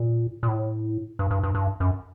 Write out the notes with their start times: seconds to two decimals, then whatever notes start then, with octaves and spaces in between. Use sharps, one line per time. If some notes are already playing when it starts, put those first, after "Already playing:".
Already playing: A#2
0.43 A#2
0.48 A2
1.19 G2
1.31 G2
1.43 G2
1.55 G2
1.80 F#2